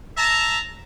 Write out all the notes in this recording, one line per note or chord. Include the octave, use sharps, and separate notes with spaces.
E5 A5 A#5